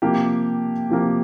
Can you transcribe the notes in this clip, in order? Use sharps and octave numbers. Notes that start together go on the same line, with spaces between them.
C3 F3 A#3 G4
C3 F3 A#3